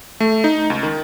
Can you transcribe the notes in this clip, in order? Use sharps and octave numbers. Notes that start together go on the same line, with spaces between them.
A3
D#4
C#2
D#3